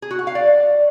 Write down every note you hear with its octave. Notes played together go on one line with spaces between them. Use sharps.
G#4
F#4
F#5
F5
D5